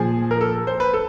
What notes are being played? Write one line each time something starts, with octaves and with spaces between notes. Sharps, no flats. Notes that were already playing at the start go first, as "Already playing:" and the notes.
Already playing: A#2 F3 G#4
A#4
A4
C5
B4
A4